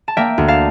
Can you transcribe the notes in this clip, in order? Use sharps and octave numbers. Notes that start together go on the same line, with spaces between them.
A5
A#3 E5 G5
D2
F5 A5